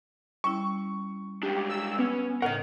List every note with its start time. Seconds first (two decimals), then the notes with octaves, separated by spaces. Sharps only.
0.44 G3 C#4 E4 C#6
1.43 G#3 D4 G4
1.70 E6
1.99 B3 C#4
2.42 A2 C#3 A#4 D#5 F#5 F6